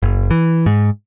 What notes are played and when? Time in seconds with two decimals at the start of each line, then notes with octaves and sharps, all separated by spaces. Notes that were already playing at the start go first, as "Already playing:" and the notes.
0.03 F#1
0.31 E3
0.66 G#2